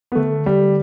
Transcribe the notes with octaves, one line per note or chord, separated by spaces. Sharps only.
B3
D3 A3
G3